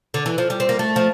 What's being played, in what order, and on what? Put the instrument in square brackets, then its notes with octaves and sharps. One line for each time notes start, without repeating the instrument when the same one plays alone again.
[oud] D3
E3
F3
G3
C4
A#3
A3
F3